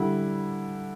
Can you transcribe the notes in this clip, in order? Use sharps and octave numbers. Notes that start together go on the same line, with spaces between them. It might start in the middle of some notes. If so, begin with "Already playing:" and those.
Already playing: D3 G3 E4